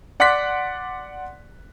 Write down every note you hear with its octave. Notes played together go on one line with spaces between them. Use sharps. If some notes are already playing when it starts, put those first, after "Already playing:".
D5 F#5 C6 D6 F#6 B6